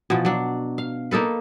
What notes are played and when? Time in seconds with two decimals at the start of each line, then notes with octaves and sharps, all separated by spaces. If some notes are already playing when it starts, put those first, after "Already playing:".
0.10 B2 E3 F3
0.25 F#3 D4
0.78 F5
1.11 A#3 D#4 A4 B4